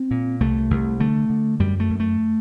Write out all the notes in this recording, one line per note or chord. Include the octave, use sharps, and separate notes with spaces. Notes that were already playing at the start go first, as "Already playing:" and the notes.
Already playing: C4
A#2
C2 A3
C2
D3 A3
D3
F#2 G3
A3
F#2
A3